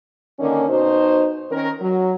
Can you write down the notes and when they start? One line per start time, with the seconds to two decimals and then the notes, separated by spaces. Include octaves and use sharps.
0.39 D3 D#3 A#3 C#4
0.69 B2 D#4 F#4 C5
1.51 D#3 C#4 A#4
1.81 F#3